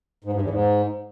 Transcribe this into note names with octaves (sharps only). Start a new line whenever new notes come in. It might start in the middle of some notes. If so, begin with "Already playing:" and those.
G#2
G2
E2
G#2